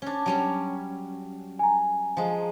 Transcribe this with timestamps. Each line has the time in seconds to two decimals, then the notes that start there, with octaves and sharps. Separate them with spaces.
0.02 C#4 D4
0.26 F#3 G3 C#4
1.59 G#5 A#5
2.17 F3 G#3